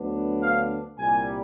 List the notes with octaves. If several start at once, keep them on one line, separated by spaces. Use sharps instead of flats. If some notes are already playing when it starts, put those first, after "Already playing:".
Already playing: D2 D3 F#3 B3 D4
F5
C2 A#2 G3 G#5